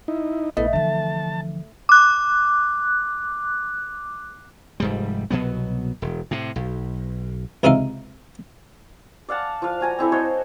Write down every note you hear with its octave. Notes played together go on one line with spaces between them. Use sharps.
D#4 E4
A#1 A3 B3 E4 D#5
D3 E3 F3 A5
D6 F#6
F1 G#2 G3
C2 B2 F#3 B3
E1
A2 C3
B1
C#2 C3 C4 D#4 E5 F5
D5 F5 F#5 A5
F3 F5
F#4 G#5 A#5
C4 E4 A4 E5
F#4 C5 C#5 D#5